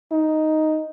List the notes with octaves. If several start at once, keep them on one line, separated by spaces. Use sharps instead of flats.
D#4